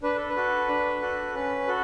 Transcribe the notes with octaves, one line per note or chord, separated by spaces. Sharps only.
D4 B4
A4
B4
F#4 A4
D4
F#4 A4
C#4 B4
F#4 A4